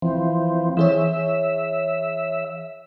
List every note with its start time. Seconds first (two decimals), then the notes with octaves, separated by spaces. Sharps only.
0.02 E3 F3 C4
0.77 E3 G#4 C#5 E5